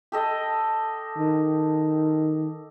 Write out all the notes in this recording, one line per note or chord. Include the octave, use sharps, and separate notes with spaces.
G4 A4 D#5
D#3